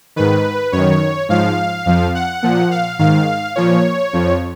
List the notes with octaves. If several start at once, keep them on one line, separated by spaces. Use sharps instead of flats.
G#2 D#3 B4
F#2 D#3 C#5
G#2 F3 F5
F2 F3
F#5
A#2 F3
F5
G#2 D#3 F5
A#2 F3 C#5
F2 F3